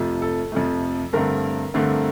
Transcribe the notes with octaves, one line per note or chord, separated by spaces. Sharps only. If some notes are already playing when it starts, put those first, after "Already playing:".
Already playing: F2 C3 F3 A3
A4
F2 C3 F3 A3
G2 D3 A3 C4 A#4
G2 D3 A3 C4